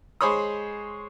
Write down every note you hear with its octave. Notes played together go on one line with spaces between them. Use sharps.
G#3 G#4 C5 C#5 B5 D#6